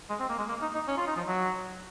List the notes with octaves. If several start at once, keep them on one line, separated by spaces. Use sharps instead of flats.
G#3
C4
A#3
G#3
A#3
D#4
D#4
C#4
F4
D#4
F3
F#3